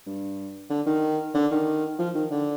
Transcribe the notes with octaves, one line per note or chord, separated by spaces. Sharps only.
G2
D3
D#3
D3
D#3
F3
D#3
D3